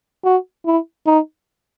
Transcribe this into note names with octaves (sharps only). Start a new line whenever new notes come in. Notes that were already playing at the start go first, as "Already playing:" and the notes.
F#4
E4
D#4